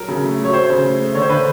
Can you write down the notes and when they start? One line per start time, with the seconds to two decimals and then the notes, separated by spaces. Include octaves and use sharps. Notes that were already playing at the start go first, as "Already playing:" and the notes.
Already playing: F#3 A#4
0.08 C#3
0.24 A3
0.39 F#3
0.45 C#5
0.53 F#3 C5
0.70 C#3
0.84 A3
1.00 A3
1.14 D3 C#5
1.22 C5
1.29 D3 B4